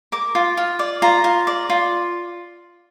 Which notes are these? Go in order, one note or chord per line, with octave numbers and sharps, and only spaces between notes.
A#4 D6
F4
F4
D5
F4 A#5
F4
D5
F4